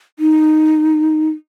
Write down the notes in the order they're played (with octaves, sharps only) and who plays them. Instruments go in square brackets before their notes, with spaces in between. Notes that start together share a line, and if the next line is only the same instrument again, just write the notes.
[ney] D#4